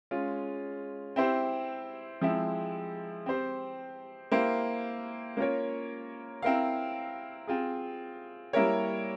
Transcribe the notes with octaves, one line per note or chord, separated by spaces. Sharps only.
G#3 C#4 F4
C4 E4 G4 C5
F3 G#3 C4 E4
C4 G4 C5
A#3 E4 G4 C5 F5
A#3 C#4 F4 A#4 C#5
C4 E4 A#4 F5
C4 F4 G#4
G3 A#3 E4 A#4 C#5